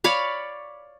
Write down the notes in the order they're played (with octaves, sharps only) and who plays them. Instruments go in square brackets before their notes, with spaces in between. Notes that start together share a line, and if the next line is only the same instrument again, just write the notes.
[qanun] C#5 D5 F5 B5